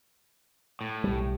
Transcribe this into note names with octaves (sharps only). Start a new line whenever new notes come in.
A2
B1 G3